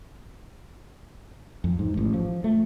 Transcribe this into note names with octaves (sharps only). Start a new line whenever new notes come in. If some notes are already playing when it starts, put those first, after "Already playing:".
F2
G#2
A1
F3
A3